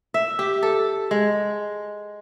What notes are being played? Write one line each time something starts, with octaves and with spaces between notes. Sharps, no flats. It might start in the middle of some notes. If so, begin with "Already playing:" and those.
E5
G4
A4
G#3